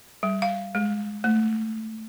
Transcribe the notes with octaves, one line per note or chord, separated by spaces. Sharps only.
G3
F5
G#3
A3